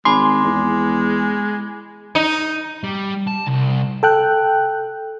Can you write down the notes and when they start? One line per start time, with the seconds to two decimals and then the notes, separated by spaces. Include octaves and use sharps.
0.05 G#1 G#3 G#5 B5 C6 D6
0.45 E2
2.15 D#4
2.84 G3
3.27 A5
3.47 C2
4.03 A4 G5 F#6